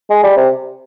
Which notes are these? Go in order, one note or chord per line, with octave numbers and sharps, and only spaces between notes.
G#3
G3
C3